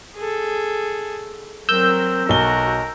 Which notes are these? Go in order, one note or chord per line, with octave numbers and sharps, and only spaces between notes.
G#4 A4
F#3 C4 A#4 E6 G6
B1 F#4 A#4 G7